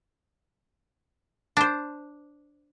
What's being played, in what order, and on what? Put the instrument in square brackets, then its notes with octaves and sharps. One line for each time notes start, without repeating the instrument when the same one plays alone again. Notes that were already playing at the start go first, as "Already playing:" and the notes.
[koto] D4 C5